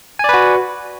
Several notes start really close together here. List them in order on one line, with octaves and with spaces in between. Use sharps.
G#5 D5 B4 F#4